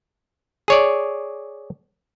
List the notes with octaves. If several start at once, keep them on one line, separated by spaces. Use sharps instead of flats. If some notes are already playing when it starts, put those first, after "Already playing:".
G#4 C#5 D5